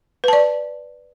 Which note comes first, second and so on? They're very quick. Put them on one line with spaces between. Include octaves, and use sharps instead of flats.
B4 A5 D5